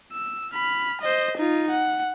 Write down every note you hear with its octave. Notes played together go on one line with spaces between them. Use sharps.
E6
B5 F6
C5 D#5
D#4 F4
F#5